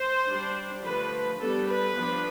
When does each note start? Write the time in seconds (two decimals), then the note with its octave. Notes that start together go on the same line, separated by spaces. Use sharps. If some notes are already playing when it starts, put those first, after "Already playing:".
Already playing: C5
0.28 G3 D4
0.84 D3 F3 A3 B4
1.40 G3 B3 D4 A4
1.68 B4
1.96 F3 B3 D4